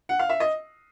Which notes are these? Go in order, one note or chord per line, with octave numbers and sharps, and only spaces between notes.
F#5
F5
E5
D#5